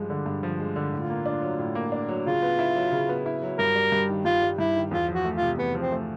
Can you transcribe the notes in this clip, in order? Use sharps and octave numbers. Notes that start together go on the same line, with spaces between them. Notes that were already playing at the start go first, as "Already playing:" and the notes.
Already playing: G2 F3 G#3
D3
G2
F3
G#3
D3
A2 F4
A#3
D4
F#3
A2
A#3
D4
F#3
C#3 F4
B3
E4
F#3
C#3
B3
E4
F#3
G2 A#4
G3
G2
D#3
G2 F4
G3
G2 E4
D#3
E2 F4
F3
F#4
A3
F4
C3
E2 B3
F3
C4
A3